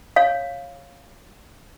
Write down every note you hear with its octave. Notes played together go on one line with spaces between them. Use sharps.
C#5 F5